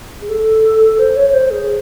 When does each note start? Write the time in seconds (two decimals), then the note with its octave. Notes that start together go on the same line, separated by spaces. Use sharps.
0.21 G#4
0.29 A4
0.99 C5
1.16 C#5
1.29 C#5
1.34 C5
1.51 G#4